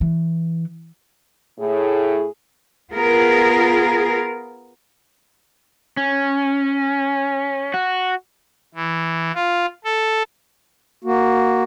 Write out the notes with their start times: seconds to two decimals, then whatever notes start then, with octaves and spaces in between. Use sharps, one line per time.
0.01 E3
1.58 A2 G#4
2.93 B3 F4 G#4 A#4
5.97 C#4
7.74 F#4
8.74 E3
9.35 F4
9.84 A4
11.04 A#3 F#4